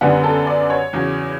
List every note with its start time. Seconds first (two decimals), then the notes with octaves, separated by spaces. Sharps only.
0.01 F#2 D3 G3 B3 F#5
0.24 A4
0.47 D5
0.70 C#5
0.93 E2 C#3 F#3